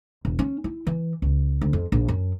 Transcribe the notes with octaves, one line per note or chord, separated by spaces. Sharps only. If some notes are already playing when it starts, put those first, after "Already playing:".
E1
C#4
E4
E3
C#2
D2
F2
A#1
F#2